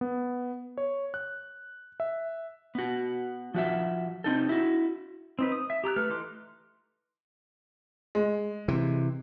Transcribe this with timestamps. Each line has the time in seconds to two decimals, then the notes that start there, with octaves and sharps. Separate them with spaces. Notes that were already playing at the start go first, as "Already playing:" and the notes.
0.01 B3
0.77 C#5
1.14 F#6
2.00 E5
2.75 B3 F#4
3.54 F3 F#4 E5
4.24 C4 D#4 A4
4.49 E4 F#4
5.39 C4 D#4 B4
5.52 D#6
5.70 E5
5.84 G4 A#5 E6 F#6
5.96 A3 B4 F6
6.10 E3 D#4 C6 D6 F#6
8.15 G#3
8.68 C3 E3